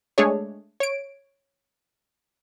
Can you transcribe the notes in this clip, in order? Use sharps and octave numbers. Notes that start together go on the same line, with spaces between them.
G#3 A3 D4 G#4 C#5
C#5 D7